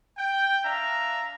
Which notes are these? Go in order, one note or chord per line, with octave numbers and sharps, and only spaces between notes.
G5
D4 E5 F5 A#5